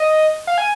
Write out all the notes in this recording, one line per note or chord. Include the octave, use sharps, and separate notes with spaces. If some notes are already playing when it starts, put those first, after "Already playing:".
Already playing: D#5
F5
G#5